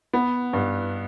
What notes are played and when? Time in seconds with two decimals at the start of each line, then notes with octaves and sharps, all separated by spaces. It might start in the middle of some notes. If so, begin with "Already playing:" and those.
0.13 B3
0.53 G2